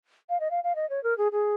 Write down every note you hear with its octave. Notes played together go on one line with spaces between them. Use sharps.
F5
D#5
F5
F5
D#5
C#5
A#4
G#4
G#4